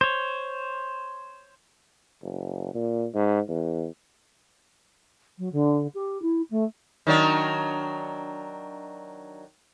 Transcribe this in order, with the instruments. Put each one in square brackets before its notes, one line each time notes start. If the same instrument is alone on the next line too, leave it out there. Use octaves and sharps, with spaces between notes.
[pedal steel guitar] C5 C#5
[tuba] F#1
A#2
G#2
E2
[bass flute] F#3
D3
G4
E4
A3
[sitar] D#3 F#3 D4